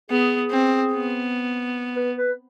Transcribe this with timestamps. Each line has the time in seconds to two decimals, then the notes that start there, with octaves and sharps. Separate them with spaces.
0.10 B3 G#4
0.51 C4
0.93 B3
1.96 B4
2.17 B4